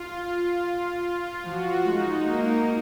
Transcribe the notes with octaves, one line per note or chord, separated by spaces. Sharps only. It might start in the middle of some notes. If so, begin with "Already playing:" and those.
Already playing: F4
F3 F#4
G#3 D#4
A#3 D#4